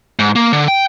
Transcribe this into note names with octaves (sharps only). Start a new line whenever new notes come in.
G#2
A#3
D3
G5